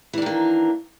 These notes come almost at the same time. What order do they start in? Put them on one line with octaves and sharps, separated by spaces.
E3 D4 D#3 A#3